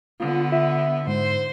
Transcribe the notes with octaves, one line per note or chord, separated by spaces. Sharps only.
D3 B3 F4
E5
G#2 C5